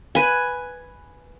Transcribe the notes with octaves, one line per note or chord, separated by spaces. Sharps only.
B4 G#5